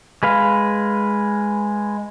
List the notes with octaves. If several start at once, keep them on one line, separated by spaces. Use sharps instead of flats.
G#3 B4 F5